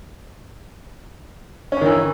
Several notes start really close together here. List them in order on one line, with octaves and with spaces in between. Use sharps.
C#4 G2 D#3 E3